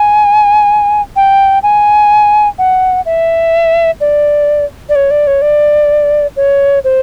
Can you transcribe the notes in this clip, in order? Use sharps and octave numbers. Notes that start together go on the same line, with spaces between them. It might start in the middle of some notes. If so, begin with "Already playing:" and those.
Already playing: G#5
G5
G#5
F#5
E5
D5
D5
C#5
D5
C#5
D5
C#5
C5